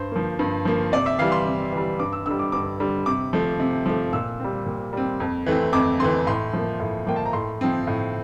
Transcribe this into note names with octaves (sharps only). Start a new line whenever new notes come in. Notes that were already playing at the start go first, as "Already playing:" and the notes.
Already playing: G2 C5
F3 A#3
G2
F3 A#3
C3 D5
E5
E3 G3 F5
C6
C3
E3 G3
G2 D6
E6
D3 G3 E6
D6
G2 D6
D3 G3
C3 D6
F3 A3
C3
F3 A3
A#2 E6
G3 C4
A#2
G3 C4
F2
E3 A3 C4
F2 D6
E3 A3 C4 C6
A2 C6
F3 A#3
A2
F3 A#3 G5
A5
A#5
A2 C6
F3 C4
A2